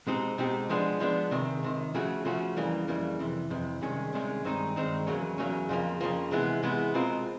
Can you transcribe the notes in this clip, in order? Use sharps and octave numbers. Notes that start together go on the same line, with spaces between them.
B2 G#3 C4 D#4 G4
B2 G#3 C4 D#4 G4
F3 G#3 B3 D4
F3 G#3 B3 D4
C#2 C3 D#3
C#2 C3 D#3
C#3 F3 A3 C#4 F#4
C#3 F3 A3 C#4 F#4
F2 C#3 E3 G3 A#3
F2 C#3 E3 G3 A#3
F2 C3 E3
F2 C3 E3
C2 C3 D#3 G#3 C#4
C2 C3 D#3 G#3 C#4
G2 D#3 G#3 C4 D#4
G2 D#3 G#3 C4 D#4
E2 C#3 F#3 A#3 C#4
E2 C#3 F#3 A#3 C#4
F2 C#3 F3 A#3
F2 C#3 F3 A#3
C3 E3 G#3 B3
C3 E3 G#3 B3
B2 G#3 C4 F4 A#4